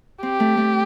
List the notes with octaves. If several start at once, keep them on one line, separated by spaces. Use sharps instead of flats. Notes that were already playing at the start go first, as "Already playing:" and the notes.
C4 G4
A3
A3